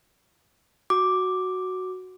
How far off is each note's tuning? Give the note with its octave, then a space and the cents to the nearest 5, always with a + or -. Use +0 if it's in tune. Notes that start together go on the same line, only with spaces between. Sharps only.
F#4 +0 D6 +0